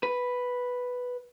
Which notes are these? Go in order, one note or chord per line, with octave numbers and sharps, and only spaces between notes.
B4